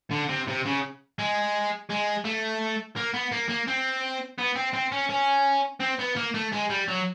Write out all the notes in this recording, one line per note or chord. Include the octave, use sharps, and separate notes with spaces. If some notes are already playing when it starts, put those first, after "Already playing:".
D3
C3
C3
C#3
G#3
G#3
A3
A#3
B3
A#3
A#3
C4
B3
C4
C4
C#4
C#4
C4
B3
A#3
A3
G#3
G3
F#3